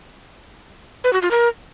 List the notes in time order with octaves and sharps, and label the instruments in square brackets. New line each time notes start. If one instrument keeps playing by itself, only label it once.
[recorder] B4
F#4
F4
A#4